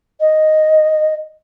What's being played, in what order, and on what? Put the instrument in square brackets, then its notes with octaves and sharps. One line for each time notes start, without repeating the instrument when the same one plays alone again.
[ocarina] D#5